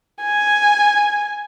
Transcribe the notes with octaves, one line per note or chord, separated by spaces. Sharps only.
G#5